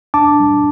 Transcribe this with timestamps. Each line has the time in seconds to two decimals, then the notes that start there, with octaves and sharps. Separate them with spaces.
0.14 D4 A5 D6
0.40 G3